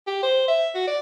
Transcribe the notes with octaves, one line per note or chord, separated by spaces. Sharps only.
G4
C5
E5
F#4
D5